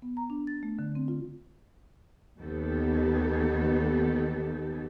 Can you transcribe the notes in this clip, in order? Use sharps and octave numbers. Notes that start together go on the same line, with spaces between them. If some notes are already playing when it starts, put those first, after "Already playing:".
B3
A#5
D4
A6
A3
D3
C4
F4
D#2 D#3 B3 G4 A4